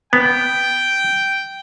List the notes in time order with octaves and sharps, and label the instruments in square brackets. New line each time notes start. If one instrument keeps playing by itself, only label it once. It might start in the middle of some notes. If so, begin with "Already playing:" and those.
[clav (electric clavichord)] B3 [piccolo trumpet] G5